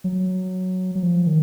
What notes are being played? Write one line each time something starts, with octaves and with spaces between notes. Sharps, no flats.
F#3
F#3
F3
D#3